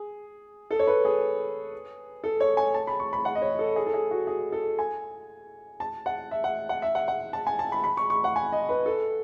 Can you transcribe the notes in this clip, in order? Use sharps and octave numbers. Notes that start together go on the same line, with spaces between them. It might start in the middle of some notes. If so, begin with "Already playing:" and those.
Already playing: G#4
A4
C#5
B4
G#4
A4
C#5
G#5
A5
B5
C#6
B5
F#5
D#5
C#5
A4
G#4
A4
G#4
F#4
G#4
A4
G#5
A5
F#5
E5
F#5
F#5
E5
F#5
F#5
A5
G#5
A5
B5
B5
C#6
C#6
F#5
G#5
D#5
B4
A4